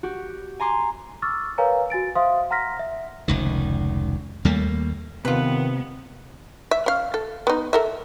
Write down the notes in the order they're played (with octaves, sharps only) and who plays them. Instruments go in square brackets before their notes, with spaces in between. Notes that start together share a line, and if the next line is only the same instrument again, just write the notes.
[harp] F#4 G4
G#5 A#5 C6 D6
[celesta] C#6 D6 E6 F6 A6
A#4 B4 C#5 F5 G#5 A#5
F#4 G#5 A6 D7
C5 E5 F5 C6 D#6
F#5 A#5 C6 F6 A#6 B6
E5
[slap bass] F1 C#2 D#3
D#2 G3 A3 A#3
[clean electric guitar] C3 [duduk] D#3 [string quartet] B3 [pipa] F4 B4
[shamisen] E5
C#4 F5
A4
B3 D#4
A4 A#4 E5